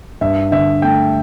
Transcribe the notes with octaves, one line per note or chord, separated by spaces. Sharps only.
G2 E5
D3 E5
A3 G5